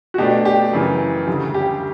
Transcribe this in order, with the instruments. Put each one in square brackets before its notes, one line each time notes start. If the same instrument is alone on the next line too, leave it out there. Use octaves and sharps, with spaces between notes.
[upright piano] F#4
[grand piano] B2 A3 D4 [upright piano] G4
[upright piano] G4
[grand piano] F#2 C#3 E3
D2 C#3 G3
[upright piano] G4